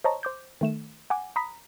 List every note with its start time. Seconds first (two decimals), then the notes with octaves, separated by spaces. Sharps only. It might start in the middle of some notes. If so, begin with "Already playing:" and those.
0.04 C5 C#5 D#5 A5 A#5 C#6
0.23 C5 D6 G6
0.61 D#3 A3 E7
1.10 F#5 G#5 D6
1.36 A#5 B5 D#6 B6